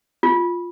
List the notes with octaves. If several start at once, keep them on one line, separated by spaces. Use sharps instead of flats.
F4